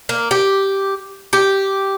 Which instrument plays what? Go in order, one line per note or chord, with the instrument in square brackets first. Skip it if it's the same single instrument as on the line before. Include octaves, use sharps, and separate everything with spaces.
[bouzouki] A#3
G4
G4